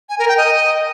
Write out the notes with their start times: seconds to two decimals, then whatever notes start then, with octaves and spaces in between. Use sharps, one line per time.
0.09 G#5
0.19 A#4
0.28 G5
0.37 D#5